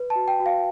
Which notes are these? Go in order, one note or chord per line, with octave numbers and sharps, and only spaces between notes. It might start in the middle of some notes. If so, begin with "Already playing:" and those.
Already playing: B4
A5
F#4
G5
F#4
F5